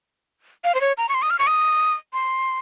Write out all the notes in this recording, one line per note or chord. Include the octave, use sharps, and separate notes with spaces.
F5
C5
C#5
A#5
C#6
C6
D#6
F6
C#6
D#6
C6